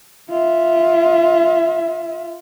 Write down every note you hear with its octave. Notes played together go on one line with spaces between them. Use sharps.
F4 E5